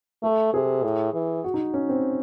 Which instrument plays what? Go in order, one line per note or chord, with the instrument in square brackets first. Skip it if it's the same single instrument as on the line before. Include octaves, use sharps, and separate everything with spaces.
[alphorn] A3 [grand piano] A4
[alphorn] C3 [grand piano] G#4
[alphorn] A2
E3
[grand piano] F#4
D#4
C#4
C4